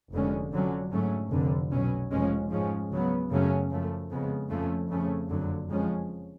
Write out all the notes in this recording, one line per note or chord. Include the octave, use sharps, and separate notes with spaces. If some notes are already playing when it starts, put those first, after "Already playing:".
F1 F2 D3 G#3 C#4
F2 D3 F#3 C#4
G#2 F#3 A3 C#4
F1 F2 D3
B1 B2 F#3 C#4
F1 F2 F3 G#3 C#4
G#2 F3 G#3 C#4
C#2 C#3 F#3 B3
F#2 C#3 F#3 A3 C#4
F#2 F3 A3
F2 C#3 G#3 B3
F2 F3 A3 C#4
F2 C#3 F3 A3 C#4
F#1 F2 D3 F#3
F2 F3 G#3 C#4